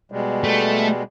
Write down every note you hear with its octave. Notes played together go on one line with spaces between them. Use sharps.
B2 G3 G#3
A3